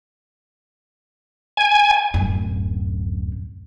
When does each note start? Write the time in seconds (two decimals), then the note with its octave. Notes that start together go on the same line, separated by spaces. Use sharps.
1.57 G#5
2.14 D1 F#2